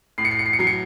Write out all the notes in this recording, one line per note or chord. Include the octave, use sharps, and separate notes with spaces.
A2 C7
C#7
C7
C#7
C7
C#7
F#3 C7
C#7